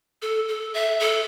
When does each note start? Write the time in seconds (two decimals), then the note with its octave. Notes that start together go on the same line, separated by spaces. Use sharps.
0.22 A4
0.48 A4
0.74 E5
1.00 A4